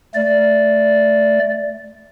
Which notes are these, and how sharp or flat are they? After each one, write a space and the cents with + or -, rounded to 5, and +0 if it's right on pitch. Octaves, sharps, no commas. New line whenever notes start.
A3 +0 D5 -10